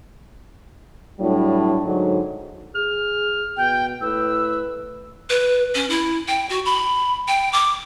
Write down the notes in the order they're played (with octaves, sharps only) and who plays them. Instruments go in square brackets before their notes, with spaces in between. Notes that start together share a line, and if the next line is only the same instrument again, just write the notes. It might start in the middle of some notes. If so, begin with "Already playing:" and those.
[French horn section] A2 F#3 G3 D4
G#2 D3 F#3
[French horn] G#4 [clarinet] F6
[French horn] B2 [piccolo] G5
[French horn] A2 [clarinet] B4 [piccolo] E6
[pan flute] B4
C#4
E4
G5
F#4
B5
G5
D6